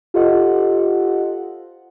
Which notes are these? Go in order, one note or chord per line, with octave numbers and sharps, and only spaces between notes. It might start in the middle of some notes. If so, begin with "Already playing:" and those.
F4 G4 A4 C5 D#5 F#5